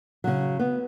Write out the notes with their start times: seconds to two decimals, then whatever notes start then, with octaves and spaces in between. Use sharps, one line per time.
0.24 C#3 F#3
0.59 B3